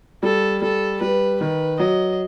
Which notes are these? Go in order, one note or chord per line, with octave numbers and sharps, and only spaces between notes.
G3 A4
G3 A4
G3 B4
D#3 B4
F#3 D#5